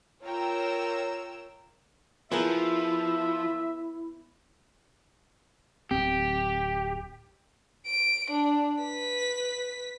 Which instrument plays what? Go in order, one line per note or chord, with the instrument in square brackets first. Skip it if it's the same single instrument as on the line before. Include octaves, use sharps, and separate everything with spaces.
[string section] F4 A#4 C#5 G5 A#5 E6
[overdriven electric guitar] F3 [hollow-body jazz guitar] B3 G#4 A#4 [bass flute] E4 [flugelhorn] E5
[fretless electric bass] D1 C4 [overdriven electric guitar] G4
[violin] D7
D4
B4 B6